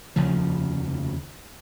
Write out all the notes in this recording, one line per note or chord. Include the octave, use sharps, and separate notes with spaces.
F1 D#2 C#3 F3